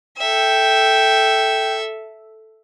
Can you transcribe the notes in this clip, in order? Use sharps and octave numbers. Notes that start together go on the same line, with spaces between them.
A4 E5 G5